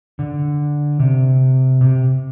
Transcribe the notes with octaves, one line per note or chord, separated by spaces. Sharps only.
D3
C3
C3